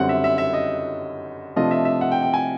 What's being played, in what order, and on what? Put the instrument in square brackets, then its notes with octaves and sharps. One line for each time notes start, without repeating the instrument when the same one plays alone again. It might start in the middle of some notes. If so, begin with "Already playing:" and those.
Already playing: [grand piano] F#2 D3 G3 C4 F#5
E5
E5
E5
D#5
C3 F3 A3 D4 F4 D#5
E5
E5
F#5
G5
G5
G#5